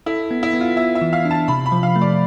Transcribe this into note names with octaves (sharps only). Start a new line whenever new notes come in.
E4 A4
B3
E4
B3
F4
B3 E5
E5
E3
F5
D4
A5
C3 B5
B5
F3
F5
A3
D5